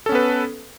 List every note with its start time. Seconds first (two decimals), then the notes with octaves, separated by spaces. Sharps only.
0.06 A4
0.09 C#4
0.12 B3
0.15 B4